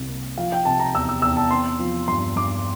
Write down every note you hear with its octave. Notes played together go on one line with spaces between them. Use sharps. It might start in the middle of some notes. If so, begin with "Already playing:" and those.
Already playing: C2 C3
A#3
F3 F5
G5
C3 A5
A#5
E2 E6
E6
E2 E6
A5
C4 C6
F3
G2 C6
G2 D6